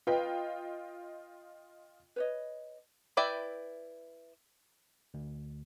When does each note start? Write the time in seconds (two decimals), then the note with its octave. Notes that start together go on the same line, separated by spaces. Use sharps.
0.07 F4 B4 D#5 G5
2.16 B4 C#5 D#5
3.17 E4 B4 D5 E5 G5
5.14 D2